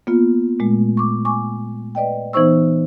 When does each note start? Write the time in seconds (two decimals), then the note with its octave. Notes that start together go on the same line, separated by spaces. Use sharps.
0.07 A#3 B3 F4
0.60 A#2 G#3 A3
0.97 C#6 D6
1.25 G#5 C#6 D6
1.95 B4 D5 D#5 G5
2.33 E3 B3 D#4 C5 C#6 E6